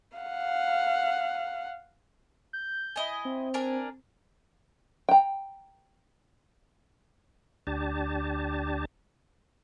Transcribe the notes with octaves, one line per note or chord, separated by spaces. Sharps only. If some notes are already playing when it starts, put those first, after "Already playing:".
F5 F#5
G6
E4 D#5 G#5
C4
D4 A#4 G#5
G5 A#5
D2 D4 G4 A5